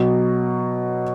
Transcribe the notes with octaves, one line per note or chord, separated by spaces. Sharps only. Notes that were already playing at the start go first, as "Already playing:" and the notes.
Already playing: B2 F#3